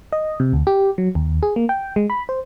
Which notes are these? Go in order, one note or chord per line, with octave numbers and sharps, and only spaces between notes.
D#5
C3
D2
G4
F#3
D#2
G#4
A#3
G5
G#3
B5
C5